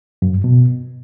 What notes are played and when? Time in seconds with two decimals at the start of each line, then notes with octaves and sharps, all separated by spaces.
0.22 F#2
0.33 G2
0.44 B2